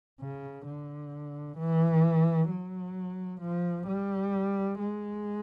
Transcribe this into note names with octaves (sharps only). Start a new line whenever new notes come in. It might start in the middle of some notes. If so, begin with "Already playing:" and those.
C#3
D3
E3
F#3
F3
G3
G#3